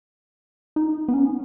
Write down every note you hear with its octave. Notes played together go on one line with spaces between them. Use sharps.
D#4
B3
C#4